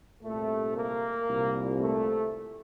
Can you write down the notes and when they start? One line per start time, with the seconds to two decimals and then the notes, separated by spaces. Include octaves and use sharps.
0.23 C2 A#2 A3
0.76 A#3
1.28 C2 A#2
1.81 A3